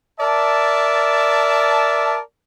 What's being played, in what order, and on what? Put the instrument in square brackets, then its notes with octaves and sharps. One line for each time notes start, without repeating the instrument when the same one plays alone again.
[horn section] A#4 D5 E5 A5